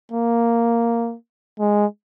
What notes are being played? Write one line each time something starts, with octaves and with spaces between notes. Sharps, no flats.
A#3
G#3